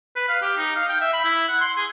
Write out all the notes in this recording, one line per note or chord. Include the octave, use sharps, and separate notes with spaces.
B4
F5
G4
D#4
F5
G5
E5
B5
E4
F#5
C6
G#4